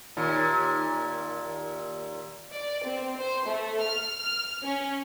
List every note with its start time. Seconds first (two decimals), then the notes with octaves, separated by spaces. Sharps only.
0.17 D#2 A#2
2.52 D5
2.85 C4
3.19 C5
3.48 A3
3.84 F6
4.18 F6
4.64 C#4